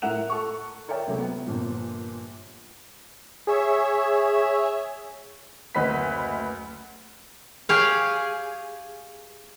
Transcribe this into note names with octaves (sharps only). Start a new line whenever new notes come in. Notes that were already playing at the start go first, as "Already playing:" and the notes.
A2 A#4 E5 F#5 F#6 F7
A4 C#6
A#4 C#5 D5 E5 G5
C#2 C3 F#3 A3
B3
G1 A#2 F3
G#4 C#5 E5
F#1 D2 B4 D#5 B5 B6
G4 G#4 C#5 F5